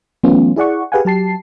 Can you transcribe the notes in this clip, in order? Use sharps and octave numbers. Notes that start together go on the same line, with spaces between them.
E3 F#3 A3 B3 C#4 F4
E4 G#4 D5 F#5 C#6
G4 G#4 B4 F5 F#5 G#5
F#3 G4 A5 C7